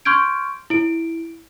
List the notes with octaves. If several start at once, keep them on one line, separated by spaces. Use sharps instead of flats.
C6 C#6 F6 G6 G#6 D7
E4 D7